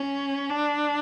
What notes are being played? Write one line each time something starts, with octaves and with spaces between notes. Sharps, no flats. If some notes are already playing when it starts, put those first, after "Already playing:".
Already playing: C#4
D4